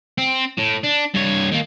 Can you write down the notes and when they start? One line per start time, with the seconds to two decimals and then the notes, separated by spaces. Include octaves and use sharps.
0.18 C4
0.59 A2
0.84 D4
1.15 G2 C#5
1.52 D#3 A#3